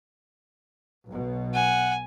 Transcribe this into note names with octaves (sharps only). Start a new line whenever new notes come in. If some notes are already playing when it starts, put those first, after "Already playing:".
B1 B2
F#5 G#5